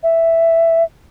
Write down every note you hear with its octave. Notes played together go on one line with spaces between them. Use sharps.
E5